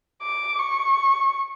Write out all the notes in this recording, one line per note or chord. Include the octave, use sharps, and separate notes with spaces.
D6
C#6